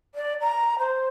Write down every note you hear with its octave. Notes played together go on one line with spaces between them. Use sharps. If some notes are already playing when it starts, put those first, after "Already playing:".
D5
A#5
C5